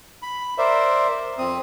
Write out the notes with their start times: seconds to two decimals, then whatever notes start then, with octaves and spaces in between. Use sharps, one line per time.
0.22 B5
0.58 A#4 C5 D5 E5
1.38 F2 C4 D#6